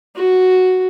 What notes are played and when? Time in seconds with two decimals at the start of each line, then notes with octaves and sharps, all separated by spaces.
0.16 F#4